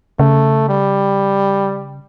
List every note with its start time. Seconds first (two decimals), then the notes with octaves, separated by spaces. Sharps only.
0.19 C#3 A3
0.69 G3